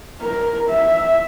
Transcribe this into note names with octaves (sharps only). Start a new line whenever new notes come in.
A#4
E5